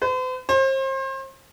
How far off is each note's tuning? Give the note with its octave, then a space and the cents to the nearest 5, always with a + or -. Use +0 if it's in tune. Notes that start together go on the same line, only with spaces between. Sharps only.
C5 -45
C5 +35